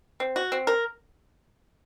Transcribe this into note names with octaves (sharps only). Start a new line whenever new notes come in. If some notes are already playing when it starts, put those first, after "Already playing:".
C4
F#4
C4
A#4